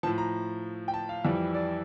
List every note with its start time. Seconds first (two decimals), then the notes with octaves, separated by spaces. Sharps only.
0.03 F3 A5
0.07 A2
0.18 A#5
0.88 G5
0.94 A5
1.09 F5
1.25 F2 E3 G3
1.55 D5